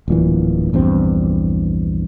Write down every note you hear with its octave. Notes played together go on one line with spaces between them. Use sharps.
D1 A#1 A#2 E3
A#1 E2 G2 C4